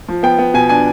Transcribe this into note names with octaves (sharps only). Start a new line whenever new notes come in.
F3
B3 G5
B3
B2 G#5
D4 G#5